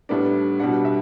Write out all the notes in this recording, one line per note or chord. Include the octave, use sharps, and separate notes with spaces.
A2 G3 B3 D4
B2 G3 D4 F#5
E5